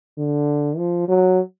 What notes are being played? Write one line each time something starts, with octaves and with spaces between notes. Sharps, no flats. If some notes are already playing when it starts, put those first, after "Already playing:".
D3
F3
F#3